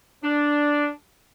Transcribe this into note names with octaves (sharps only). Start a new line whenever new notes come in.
D4